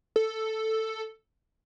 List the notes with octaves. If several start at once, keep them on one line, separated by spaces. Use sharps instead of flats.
A4